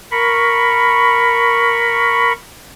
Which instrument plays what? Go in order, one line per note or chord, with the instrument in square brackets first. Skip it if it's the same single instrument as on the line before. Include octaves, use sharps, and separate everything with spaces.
[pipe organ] A#4 B5 C#6